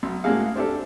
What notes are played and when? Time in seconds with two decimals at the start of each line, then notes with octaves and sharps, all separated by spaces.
0.03 B1
0.24 A2 G#3 A#3 F#4 G#4 F5
0.56 C4 D4 G4 A4